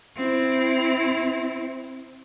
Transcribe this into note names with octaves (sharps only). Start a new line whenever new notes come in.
C4 E4